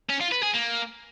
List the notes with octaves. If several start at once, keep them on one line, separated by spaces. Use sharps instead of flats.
C#4
F4
B4
G#4
A#3